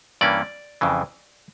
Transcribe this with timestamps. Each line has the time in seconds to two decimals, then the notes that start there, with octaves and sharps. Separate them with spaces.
0.21 G2 E3 A#3 C#4 D5
0.81 F2 C#3 E3